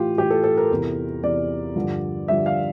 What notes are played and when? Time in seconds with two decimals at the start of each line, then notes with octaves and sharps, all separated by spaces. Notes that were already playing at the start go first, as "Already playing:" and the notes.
Already playing: A2 E3 F4 G4
0.18 A2 E3 G4
0.30 A4
0.44 A4
0.57 A#4
0.71 E2 C3 E3
1.23 E2 C3 E3 D5
1.76 G2 D3 F3
2.28 G2 D3 F3 E5
2.46 F5